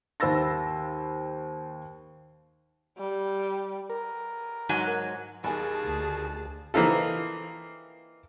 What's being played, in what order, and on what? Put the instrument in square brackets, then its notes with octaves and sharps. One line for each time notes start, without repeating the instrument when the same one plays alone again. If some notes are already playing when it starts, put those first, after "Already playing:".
[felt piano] D#2 C5 B5 E6 A6 A#6
[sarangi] G3
[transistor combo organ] A#4
[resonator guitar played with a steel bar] G#2 F#3 G#5
[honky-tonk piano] D#2 [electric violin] G#4 A5 [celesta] G#5 B5
[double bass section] D2
[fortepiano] E3 A#3 C4 D#4 F4 A4